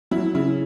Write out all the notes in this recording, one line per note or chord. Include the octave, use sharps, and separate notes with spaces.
F#3 E4
C#3 E4